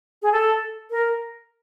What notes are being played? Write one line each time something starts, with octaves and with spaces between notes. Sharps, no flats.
G#4
A4
A#4